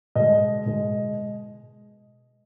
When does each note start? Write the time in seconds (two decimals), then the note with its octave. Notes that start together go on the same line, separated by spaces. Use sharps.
0.15 B2 G#3 D#5
0.66 B2 G#3